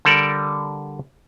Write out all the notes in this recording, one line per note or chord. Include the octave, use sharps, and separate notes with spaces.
D3 G3 A4 A#4 D5